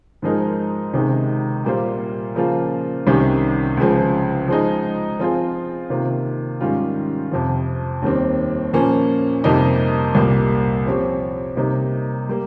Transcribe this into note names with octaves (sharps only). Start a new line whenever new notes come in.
G#2 F3 G#3 D#4 A#4
C#2 C3 D#3 G#3 D#4
A#2 G3 A#3 F4 C5
C#3 F3 A#3 F4
C2 C3 D#3 G3 C#4
C#2 C#3 F3
F3 G#3 D#4
F3 C4 F4 G#4 C5
C3 D#3 A#3 F4
G#2 D#3 G3 C#4 F4
F2 C3 F3
D#2 D#3 G3 C4
A#2 F3 A#3 C#4
F2 C3 G3 A#3 D#4
C2 A#2 G3 A#3
F3 C4 G4 C#5
C3 G3 A#3 D#4
G3 A#3